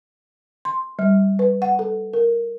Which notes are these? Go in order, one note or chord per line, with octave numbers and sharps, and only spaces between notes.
C6
G3
B4
F#5
A4
A#4